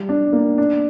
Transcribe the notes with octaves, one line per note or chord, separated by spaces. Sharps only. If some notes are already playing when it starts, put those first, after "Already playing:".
Already playing: G3
D4
A#3
D4